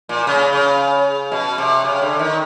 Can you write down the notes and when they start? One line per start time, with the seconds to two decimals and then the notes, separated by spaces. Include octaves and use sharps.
0.09 A#2
0.27 C#3
0.53 C#3
1.32 B2
1.58 C3
1.85 C#3
2.02 D3
2.19 D#3